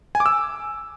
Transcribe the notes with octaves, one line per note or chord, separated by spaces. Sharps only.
G#5
D6
E6